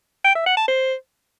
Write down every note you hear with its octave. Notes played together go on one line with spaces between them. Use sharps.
G5
E5
F#5
A5
C5